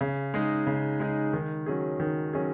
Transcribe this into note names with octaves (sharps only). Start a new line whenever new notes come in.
C#3
G#3 D#4 G#4
C#3
G#3 D#4 G#4
D#3
F#3 C#4 G#4
D#3
F#3 C#4 G#4